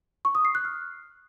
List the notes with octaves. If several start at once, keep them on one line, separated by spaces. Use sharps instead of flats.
C#6
D#6
C7
F#6
F6